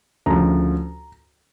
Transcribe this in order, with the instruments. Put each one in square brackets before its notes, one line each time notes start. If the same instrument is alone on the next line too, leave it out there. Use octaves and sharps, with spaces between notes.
[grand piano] D2 C#3 F3 A#5